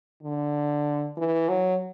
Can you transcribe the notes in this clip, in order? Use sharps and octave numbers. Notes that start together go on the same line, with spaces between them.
D3
E3
F#3